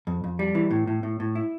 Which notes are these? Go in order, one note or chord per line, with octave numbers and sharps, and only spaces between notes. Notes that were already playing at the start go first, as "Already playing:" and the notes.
F2
F2
G3
E3
A2
A2
A2
A2
E4